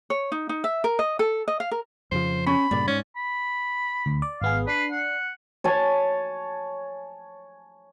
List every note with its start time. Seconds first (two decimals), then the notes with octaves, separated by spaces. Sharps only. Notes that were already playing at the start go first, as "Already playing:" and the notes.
0.10 C#5
0.32 D#4
0.49 D#4
0.64 E5
0.84 A#4
0.99 D#5
1.19 A4
1.48 D#5
1.60 F5
1.71 A#4
2.12 F2 C#3 F3 C5
2.47 C#4 B5
2.71 G2 A#2 C#3 D5
2.88 G#2 C#4
3.16 B5
4.06 D2
4.22 D5
4.42 G#1 B3 G#4 F5
4.67 D4 B4 C7
4.91 F#5
5.64 C#5 G#5 A5